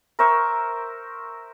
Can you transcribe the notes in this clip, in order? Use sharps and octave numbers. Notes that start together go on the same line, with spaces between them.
A#4 C5 E5 C#6